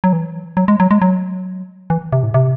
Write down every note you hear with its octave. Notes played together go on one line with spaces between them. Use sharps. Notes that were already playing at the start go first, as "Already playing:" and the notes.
F#3
E3
F#3
G#3
F#3
G#3
F#3
E3
C3
A2
C3